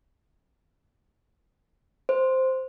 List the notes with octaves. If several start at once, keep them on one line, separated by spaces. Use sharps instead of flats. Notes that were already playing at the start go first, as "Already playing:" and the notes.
C5